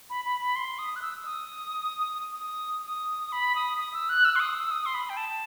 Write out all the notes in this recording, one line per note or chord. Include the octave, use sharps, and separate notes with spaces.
B5
B5
B5
C6
D#6
F#6
E6
D#6
D#6
D#6
B5
D#6
D#6
E6
F#6
E6
C6
D#6
E6
D#6
C6
B5
G5
A5